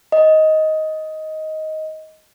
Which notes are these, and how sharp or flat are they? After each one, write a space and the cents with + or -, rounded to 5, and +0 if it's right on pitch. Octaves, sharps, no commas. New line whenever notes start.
D#5 +10